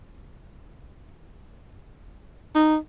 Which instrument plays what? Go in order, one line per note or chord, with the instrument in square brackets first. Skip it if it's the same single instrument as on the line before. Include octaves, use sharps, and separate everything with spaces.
[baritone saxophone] D#4